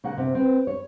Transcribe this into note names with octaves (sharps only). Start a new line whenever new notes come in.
C#3 A#3 F#5
C3
C4 B4
C#5